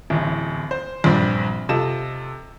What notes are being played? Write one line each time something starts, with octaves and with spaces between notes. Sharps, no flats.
D1 A1
C5
A#1 G2 C4 D5
C3 F4 A4 D#5 E7